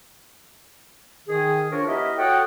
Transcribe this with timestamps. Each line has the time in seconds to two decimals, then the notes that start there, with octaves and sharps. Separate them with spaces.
1.28 D#3 G#4
1.71 F3 D4 A#4 C#5
1.86 B3 E4 G4 A#4 D#5 E5
2.16 F#4 A4 C#5 D#5 F#5 G5